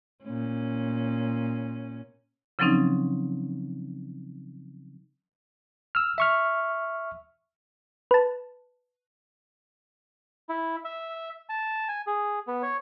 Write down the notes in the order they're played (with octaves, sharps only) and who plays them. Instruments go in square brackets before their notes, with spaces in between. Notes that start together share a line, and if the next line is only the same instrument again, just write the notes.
[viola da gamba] A#2 C#4
[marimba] C#3 F3 F#3 C4 C#4 D#4
[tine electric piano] E6 F6
E5 C#6 F6
[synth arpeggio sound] B4 A5
[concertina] E4
E5
A5
G#5
G#4
B3
C#5